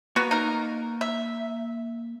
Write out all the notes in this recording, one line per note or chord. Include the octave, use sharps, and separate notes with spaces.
A#3 B3 F#4 A#5
D#4 A#4
E5